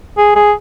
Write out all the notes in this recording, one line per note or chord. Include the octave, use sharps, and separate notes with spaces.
G#4
G#4